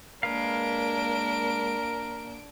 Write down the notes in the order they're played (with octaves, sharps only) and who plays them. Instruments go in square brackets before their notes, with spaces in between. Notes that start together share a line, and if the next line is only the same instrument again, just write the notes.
[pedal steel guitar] G#3 B4 F5 [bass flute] A#3 [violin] D4 D7 [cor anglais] A#4